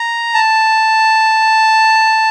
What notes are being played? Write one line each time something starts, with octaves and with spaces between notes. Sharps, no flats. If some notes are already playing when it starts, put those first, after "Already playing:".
Already playing: A#5
A5